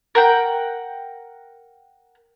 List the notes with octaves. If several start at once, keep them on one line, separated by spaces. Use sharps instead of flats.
A#4 F#5 G5